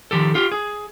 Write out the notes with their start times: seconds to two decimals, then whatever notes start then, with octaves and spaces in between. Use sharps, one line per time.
0.11 D#3 F3 G4 A4
0.35 F4 G4
0.52 G#4